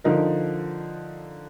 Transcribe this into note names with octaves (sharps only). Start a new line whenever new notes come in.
D3 F3 D#4 A#4